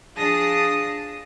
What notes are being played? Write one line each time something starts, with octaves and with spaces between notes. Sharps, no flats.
F3 D4 G#4 A5 D#6 A#6